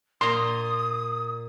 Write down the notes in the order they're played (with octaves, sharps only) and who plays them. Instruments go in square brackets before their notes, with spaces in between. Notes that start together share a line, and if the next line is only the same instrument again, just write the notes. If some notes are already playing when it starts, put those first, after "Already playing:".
[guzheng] A#2 A#5 [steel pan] C6 [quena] D#6